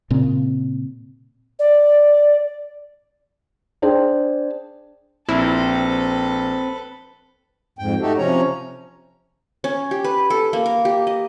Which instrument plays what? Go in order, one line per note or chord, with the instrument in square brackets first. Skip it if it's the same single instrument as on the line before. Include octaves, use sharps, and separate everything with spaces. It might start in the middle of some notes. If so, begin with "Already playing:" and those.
[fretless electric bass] A#2 C#3 C4
[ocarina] D5
[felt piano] D4 G#4 C5 G5
[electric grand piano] A#1 [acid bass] C4 [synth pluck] E4 [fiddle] A4 B4
[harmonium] F2 G#2 G5
A3 D#4 F#4 G4 A4
C3 F3 C#4 C#5 A#5
[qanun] C#4
G4
B4
A4
A#3
A#4
G4
D#5